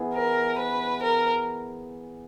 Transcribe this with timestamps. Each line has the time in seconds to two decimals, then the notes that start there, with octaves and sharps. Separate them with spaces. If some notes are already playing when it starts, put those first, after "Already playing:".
Already playing: E3 B3 E4 G#4
0.14 A#4
0.59 B4
1.03 A#4